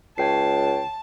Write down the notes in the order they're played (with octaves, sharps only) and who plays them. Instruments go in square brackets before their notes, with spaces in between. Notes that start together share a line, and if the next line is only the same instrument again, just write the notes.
[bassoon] C#2 [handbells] C#5 G5 C7 [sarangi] A5